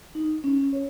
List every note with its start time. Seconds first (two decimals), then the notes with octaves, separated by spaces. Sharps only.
0.15 D#4
0.44 C#4
0.73 C#5